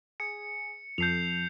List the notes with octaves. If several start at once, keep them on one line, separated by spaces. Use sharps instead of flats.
G#4 C#7
F2 A4 G6 C7 F7